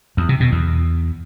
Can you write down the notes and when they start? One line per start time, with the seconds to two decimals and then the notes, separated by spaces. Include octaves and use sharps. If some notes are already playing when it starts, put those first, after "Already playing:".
0.17 E2
0.29 C3
0.40 B2
0.52 E2